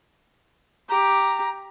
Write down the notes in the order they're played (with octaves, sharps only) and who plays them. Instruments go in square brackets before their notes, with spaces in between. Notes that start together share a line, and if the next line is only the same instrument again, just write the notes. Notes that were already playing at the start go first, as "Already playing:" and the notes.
[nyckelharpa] G4 [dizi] A#5